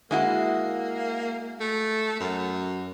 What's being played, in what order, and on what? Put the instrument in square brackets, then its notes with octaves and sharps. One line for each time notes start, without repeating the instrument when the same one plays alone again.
[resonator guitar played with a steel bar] G#3 E4 F#4 [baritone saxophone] A#3
[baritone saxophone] A3
F#2